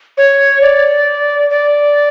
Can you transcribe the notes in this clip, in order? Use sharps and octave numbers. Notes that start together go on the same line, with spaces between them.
C#5
D5
D5